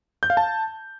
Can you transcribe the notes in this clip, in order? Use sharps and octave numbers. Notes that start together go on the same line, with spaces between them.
G6
F5
A5